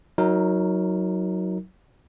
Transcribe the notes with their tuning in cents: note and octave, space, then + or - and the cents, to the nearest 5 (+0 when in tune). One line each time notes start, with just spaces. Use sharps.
F#3 +0 D#4 +30 A#4 -5